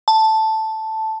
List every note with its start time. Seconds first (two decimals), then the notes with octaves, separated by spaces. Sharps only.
0.08 A5